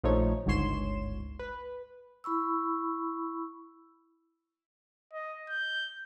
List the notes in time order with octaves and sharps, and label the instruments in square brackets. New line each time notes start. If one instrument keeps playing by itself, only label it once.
[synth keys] A#1 F3 A3 D#4 C#5
G1 C#2 G#2 C#5 C6 E7
B4
[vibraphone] E4 B5 C#6 E6
[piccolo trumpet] D#5
G6